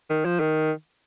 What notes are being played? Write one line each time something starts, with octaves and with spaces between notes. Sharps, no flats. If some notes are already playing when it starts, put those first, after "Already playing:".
D#3
F3
D#3